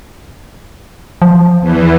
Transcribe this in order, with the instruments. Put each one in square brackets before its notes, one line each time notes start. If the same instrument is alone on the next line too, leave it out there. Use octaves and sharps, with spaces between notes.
[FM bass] F3
[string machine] E2 E3